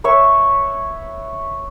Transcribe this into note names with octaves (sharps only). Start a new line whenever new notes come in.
B4 C#5 E5 C#6